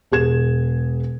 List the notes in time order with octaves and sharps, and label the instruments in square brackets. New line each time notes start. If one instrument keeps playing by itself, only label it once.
[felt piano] E1 G#4 G#6 E7